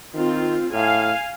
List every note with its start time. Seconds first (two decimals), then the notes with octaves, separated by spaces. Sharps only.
0.14 D#3 C4 F4
0.73 A2 F5 G#5